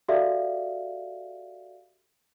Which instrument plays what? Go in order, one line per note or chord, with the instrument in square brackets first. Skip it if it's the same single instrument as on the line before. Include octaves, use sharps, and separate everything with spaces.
[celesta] F#4 G4 A4 D5 E5 F5